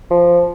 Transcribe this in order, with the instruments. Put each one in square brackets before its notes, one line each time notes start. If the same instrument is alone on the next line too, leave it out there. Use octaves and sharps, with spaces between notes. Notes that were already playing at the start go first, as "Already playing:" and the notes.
[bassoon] F3